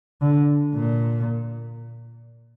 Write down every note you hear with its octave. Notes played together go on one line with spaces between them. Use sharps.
D3
A#2